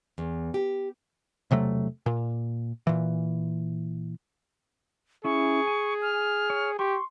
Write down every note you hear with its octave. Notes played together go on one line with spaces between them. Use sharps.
E2
G4
E1 C3 F#3 A3
A#2
A#2 E3
C#4 E4 G#4 C#6
G#5
F6
C#5
G4 C6 C#6